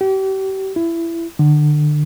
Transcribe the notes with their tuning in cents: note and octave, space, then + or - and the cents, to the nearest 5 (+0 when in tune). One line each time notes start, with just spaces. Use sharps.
G4 -35
E4 +20
D3 +30